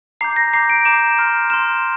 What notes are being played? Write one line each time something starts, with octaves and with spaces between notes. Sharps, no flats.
A#5 D6 G6 C7
A#6
A#5 D6 G6 C7
D7
A#5 D6 G6 E7
C6 F6
C6 F6 E7